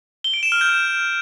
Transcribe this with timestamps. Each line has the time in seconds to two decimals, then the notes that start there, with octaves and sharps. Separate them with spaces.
0.24 G7
0.34 D7
0.43 E7
0.52 F6
0.61 G6